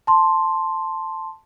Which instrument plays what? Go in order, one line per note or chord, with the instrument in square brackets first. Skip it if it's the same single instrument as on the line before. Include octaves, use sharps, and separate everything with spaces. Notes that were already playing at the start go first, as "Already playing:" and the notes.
[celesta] A5 C6